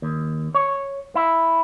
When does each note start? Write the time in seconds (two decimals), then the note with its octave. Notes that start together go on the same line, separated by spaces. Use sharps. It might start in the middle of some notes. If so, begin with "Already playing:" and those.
0.02 D#2
0.55 C#5
1.15 E4